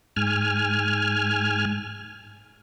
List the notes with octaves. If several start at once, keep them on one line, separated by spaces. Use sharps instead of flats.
G#2 G#5 F6